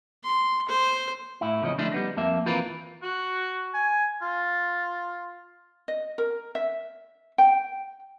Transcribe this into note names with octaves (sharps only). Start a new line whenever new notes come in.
C6
C5
A2 E4
E2 C#3 F3 C#5 D#5
D3 F3 A3 C#4 D4 E4
G3 B3 D#4
F2 A#3 E5
E3 C4 F4 A#4 B4
F#4
G#5
F4
D#5
A#4
E5
G5